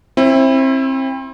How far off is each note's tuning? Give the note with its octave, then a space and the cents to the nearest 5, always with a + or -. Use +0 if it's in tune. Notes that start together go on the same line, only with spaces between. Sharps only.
C4 +30 E4 +0